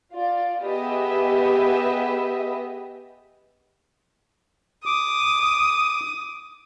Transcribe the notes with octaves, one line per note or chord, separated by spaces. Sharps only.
F4 D5
B3 G4 G#4 B4 D#5 E5
D6 D#6